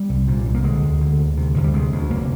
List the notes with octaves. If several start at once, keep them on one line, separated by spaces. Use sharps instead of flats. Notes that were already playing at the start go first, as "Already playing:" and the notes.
Already playing: G3
C2
A#2
C2
A#3
D3 G#3
D2
D3
D2
C3
D2 F3
G3
C3 G#3
D2
F1 A#3